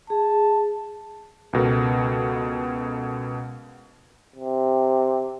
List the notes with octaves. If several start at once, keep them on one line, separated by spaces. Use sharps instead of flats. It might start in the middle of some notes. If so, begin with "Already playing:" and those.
G#4 A5
C#2 B2 A4 A#4
C3